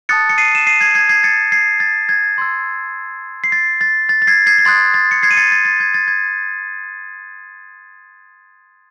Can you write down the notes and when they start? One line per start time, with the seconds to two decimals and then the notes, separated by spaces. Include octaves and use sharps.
0.09 A5 D#6 F#6 A6 C#7
0.29 C#7
0.38 C7 D#7
0.55 E7
0.67 C7 D#7
0.81 G#6 C7
0.95 G#6 C7
1.09 G#6 C7
1.24 A6 C#7
1.52 G#6 C7
1.80 A6
2.09 G#6
2.38 C6 E6
3.44 C7
3.52 A6
3.81 A6
4.09 A6
4.22 A6
4.27 G#6 C7
4.47 G#6 C7
4.58 G#6
4.65 C6 D#6 F#6 A6
4.94 A6
5.11 C#7
5.23 G#6 C7
5.31 D#7
5.37 A6 C#7
5.52 A6
5.65 A6
5.80 G#6
5.94 A6
6.08 G#6